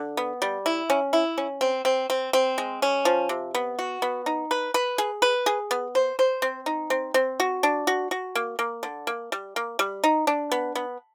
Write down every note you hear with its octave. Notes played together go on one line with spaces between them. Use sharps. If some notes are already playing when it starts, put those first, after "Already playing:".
Already playing: D3
B3
G3
E4
C#4
E4
C#4
C4
C4
C4
C4
G#3
C#4
F3
C3
B3
F#4
B3
D#4
B4
B4
G#4
B4
G#4
B3
C5
C5
C4
D#4
C4
C4
F#4
D4
F#4
F#4
A#3
A#3
D3
A#3
G3
A#3
G3
D#4
D4
B3
B3